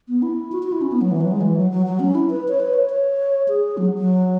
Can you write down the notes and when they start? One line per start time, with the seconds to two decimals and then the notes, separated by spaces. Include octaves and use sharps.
0.08 B3
0.22 E4
0.52 F#4
0.63 F#4
0.72 E4
0.82 C#4
0.92 B3
1.01 F#3
1.11 E3
1.21 F#3
1.32 G#3
1.41 E3
1.56 F#3
1.71 F#3
1.86 F#3
2.00 C#4
2.15 E4
2.30 B4
2.48 C#5
2.60 B4
2.74 C#5
2.90 C#5
3.48 G#4
3.77 F#3
3.98 F#3